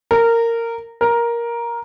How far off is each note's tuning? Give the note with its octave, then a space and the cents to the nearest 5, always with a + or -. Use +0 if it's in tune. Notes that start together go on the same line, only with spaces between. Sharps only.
A#4 -15
A#4 +10